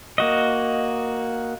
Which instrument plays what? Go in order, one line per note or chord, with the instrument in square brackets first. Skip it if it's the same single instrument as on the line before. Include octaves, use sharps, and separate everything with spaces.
[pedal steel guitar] A#3 F#4 D#5